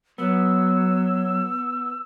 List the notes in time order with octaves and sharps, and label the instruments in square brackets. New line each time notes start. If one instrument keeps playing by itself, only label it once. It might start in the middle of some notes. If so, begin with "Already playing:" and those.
[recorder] F#3 [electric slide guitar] B3 [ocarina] E6